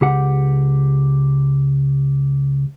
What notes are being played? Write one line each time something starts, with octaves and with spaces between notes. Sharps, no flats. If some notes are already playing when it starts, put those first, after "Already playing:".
C#2 G4 F#5